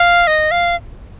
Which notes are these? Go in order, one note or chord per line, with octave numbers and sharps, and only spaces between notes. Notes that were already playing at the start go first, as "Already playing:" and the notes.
Already playing: F5
D#5
F5